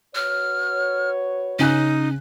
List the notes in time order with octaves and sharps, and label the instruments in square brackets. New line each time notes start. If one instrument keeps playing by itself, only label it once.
[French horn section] F#4 B4 C#5 [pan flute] F6
[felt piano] C#3 G#5 F#6 [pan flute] C#4 [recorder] D#4